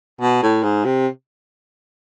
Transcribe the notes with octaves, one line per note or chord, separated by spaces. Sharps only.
B2
A2
G#2
C3